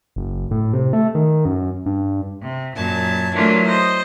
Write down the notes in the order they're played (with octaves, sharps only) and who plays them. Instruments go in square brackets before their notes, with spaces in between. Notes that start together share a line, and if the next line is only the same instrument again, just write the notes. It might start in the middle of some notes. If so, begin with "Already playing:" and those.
[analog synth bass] F#1
A2
C3
A3
D#3
F#2
G2
[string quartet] C3
F#2 A#2 A5 G#6
E3 F#3 A3 A#3 D4 F4
C5 D#5